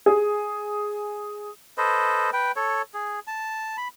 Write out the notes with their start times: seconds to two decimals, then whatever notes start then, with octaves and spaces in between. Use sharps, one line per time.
0.06 G#4
1.78 A4 B4 C5 D#5
2.33 B4 G5
2.56 A4 C#5
2.94 G#4
3.27 A5
3.77 B5